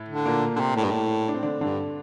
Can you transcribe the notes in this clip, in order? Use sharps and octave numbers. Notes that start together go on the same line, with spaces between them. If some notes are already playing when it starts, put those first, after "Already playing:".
Already playing: A2 A3
D3
A#2 A#3
D3
C3
A2
G2
A2
D4
C4
D3 D4
G2 D3 D4